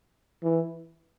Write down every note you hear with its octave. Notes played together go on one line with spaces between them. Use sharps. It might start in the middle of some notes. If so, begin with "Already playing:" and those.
E3